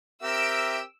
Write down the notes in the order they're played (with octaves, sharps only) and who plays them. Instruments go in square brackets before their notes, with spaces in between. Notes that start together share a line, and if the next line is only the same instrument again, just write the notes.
[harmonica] C4 G4 A#4 [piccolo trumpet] E5 [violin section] E6 D7